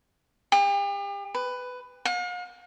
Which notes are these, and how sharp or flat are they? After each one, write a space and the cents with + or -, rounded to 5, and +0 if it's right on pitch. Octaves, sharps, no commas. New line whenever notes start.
G4 +40
B4 +15
F5 +45